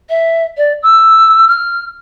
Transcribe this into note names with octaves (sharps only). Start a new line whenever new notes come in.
E5
D5
E6
F6